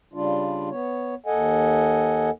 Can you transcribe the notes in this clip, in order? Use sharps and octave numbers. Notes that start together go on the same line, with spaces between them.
C#3 G3 D4 F4
B3 C#5
D#2 A4 D#5 F#5 G#5